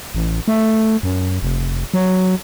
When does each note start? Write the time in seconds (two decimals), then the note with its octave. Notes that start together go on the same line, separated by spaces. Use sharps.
0.15 A1
0.48 A3
1.03 F#2
1.42 F1
1.94 F#3